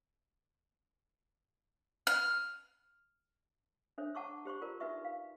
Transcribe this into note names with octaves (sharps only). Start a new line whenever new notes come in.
F6
D4 A4 C5 C#5 E5
F#5 A5 A#5 C#6 D6 E6
G4 C5 C6 C#6
F4 G4 A#4 C5 D5 A#5
D#4 F#4 B4 E5 C#6
F5